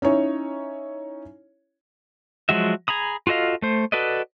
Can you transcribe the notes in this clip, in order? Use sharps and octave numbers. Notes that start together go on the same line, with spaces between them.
C#4 D#4 E4 C#5
F3 F#3 G#3 F#4 E5
G#4 A#5 B5 D#6
F4 F#4 A4 D#5 F5
A3 C5
F#4 A4 B4 D5 D#5